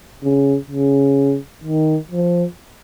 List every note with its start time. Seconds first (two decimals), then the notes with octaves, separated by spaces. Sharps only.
0.23 C#3
0.70 C#3
1.64 D#3
2.11 F3